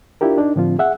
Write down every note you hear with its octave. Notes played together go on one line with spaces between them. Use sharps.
D4 E4 F4 G4 A#4
D4 D#4
A2 D3 F3 C4 F4
G#4 E5 F#5